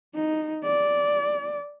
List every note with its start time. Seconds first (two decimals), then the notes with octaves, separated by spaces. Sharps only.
0.15 D#4
0.64 D5